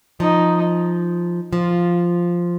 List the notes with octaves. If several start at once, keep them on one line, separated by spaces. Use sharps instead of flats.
F3 D#4
F3 F4